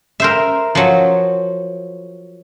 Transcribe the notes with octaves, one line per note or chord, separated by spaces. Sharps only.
A#4 C5 E5
F3 F#3